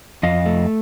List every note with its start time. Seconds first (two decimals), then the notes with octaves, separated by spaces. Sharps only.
0.23 F2 D#5 F5
0.46 A3